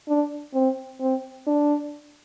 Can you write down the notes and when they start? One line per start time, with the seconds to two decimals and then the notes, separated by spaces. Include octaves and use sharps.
0.08 D4
0.54 C4
1.00 C4
1.47 D4